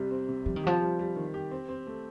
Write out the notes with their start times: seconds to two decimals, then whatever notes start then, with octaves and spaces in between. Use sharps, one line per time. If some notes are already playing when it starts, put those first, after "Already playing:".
Already playing: C2 C3 G3 C4
0.11 C4
0.29 C3
0.46 F3 G3
0.56 D#3
0.64 F3 G4
0.81 G3
0.99 G3
1.16 D#3
1.34 G4
1.51 C4
1.69 C4
1.87 A3